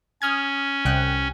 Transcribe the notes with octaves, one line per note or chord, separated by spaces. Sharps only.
C#4 D#6 F6 G#6
C2 G5 F#6